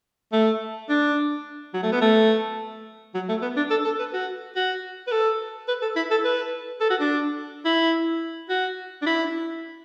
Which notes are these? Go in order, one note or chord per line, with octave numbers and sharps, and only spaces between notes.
A3
D4
F#3
A3
B3
A3
F#3
A3
B3
D4
A4
A4
B4
F#4
F#4
B4
A4
B4
A4
E4
A4
B4
A4
F#4
D4
E4
F#4
D4
E4